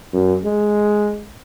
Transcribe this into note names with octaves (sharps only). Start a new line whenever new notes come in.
F#2
G#3